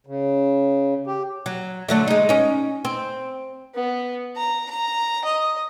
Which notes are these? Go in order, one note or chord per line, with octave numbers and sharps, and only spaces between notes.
C#3
G4
F#3
D3 F#3 A3
G#3 D#4
C#4 D#4
C4
B3
A#5
A#5
D#5